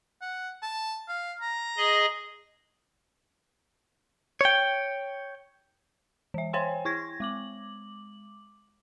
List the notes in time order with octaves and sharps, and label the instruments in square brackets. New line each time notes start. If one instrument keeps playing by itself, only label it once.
[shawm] F#5
A5
F5
A#5
[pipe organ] G#4 D#5
[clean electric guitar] C#5 G5
[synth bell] E3 E5
C5 C#5 G5 G#5 C6
E4 C#6 G#6 A#6
G#3 D6 F#7